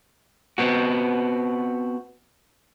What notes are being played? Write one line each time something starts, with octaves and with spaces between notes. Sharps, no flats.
B3 C4 F#4